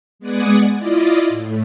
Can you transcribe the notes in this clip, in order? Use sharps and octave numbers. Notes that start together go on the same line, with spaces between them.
G#3 B3 D5 F#5 G#5 D#6
E4 F4 D5 D#5
A2